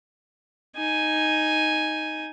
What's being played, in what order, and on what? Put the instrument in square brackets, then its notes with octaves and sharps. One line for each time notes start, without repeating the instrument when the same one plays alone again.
[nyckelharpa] D#4 G#5